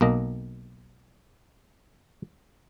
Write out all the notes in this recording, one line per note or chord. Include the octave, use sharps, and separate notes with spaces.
B1 A#3 D#5